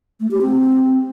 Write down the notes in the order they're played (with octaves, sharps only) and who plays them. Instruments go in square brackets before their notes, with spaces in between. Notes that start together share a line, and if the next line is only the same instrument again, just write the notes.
[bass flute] A3
G4
C4